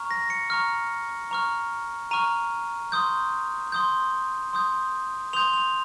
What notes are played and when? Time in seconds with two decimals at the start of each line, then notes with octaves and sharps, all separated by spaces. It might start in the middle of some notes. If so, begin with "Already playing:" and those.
Already playing: A#5 C#6 F6
0.11 A#6
0.30 C#7
0.50 A#5 C#6 F6
1.31 A#5 C#6 F6
2.11 A#5 C#6 F6 D#7
2.92 C6 D#6 G6
3.72 C6 D#6 G6
4.53 C6 D#6 G6
5.33 C6 D#6 G6 F7
5.54 F7